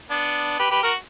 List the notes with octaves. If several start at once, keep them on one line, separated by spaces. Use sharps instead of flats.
B3 D4
G4 B4
G4 B4
F#4 A#4